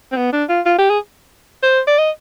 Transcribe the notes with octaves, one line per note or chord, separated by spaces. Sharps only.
C4
B3
D4
F4
F4
G4
G#4
C5
D5
D#5